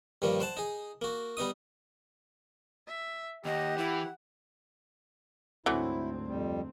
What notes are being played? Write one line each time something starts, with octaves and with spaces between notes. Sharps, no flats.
G2 D#3 F3 G3 A#3
C5 F#5 A5
D#4 G#4
A#3 F#4
G3 B3 D#4 D#6
E5
D#2 G4 D#5 F#5
E3 E4
D2 G#2 E3 F#3 A3 C4 E4
F2 G3